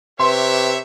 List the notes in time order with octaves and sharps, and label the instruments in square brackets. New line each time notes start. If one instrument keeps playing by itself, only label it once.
[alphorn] C3 [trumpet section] G4 C#5 E5 [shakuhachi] B4 [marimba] C6